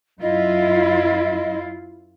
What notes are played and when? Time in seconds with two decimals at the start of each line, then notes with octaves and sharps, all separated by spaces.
0.21 F#2 E4 F4 D#5